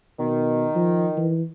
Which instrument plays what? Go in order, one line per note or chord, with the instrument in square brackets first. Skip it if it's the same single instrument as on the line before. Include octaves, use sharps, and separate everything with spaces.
[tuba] B2 [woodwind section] D#3
[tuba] F3
E3